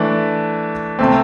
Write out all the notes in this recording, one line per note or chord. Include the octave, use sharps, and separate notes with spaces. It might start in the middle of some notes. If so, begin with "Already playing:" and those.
Already playing: E3 A3 D4
C3 A3 C4